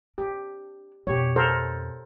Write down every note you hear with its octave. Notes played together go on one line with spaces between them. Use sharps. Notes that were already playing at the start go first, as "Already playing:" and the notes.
D4 G4
F2 B2 G4 C#5
A4 A#4 C5